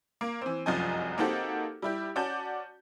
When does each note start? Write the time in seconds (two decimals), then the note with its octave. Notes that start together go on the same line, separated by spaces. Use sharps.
0.21 A#3
0.41 E3 C4
0.66 F1 C2 F#2 F3 D#5 G#5
1.18 A#3 C4 D#4 F#4 G4 A4
1.82 G3 E4 G4
2.16 C#4 F#4 D5 A5 D6 G6